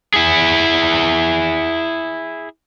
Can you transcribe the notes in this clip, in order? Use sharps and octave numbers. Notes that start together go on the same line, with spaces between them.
E4 G#4